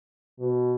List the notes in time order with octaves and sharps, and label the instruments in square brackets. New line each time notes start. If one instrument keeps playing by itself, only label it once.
[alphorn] B2